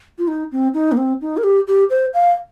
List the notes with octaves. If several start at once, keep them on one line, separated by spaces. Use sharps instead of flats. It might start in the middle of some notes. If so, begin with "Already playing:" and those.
F4
D#4
C4
D#4
A#3
C4
D#4
A#4
G4
G4
C5
F5